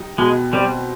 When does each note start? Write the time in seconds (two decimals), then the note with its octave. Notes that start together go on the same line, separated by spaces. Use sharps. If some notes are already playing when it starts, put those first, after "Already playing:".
Already playing: G3 D#4
0.18 B2 G#3
0.53 G3 C4